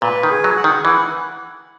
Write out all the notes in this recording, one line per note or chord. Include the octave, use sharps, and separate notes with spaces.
A#2 B4
D#3
G#4
F#3
F#5
D#3
E3 F#5